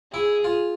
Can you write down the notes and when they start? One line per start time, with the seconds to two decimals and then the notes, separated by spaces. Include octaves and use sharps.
0.13 E4 G#4
0.44 F4